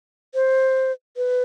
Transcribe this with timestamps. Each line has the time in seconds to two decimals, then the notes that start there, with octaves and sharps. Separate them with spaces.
0.35 C5
1.17 B4